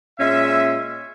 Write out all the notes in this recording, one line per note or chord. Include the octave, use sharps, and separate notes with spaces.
A#2 G#3 C#4 E5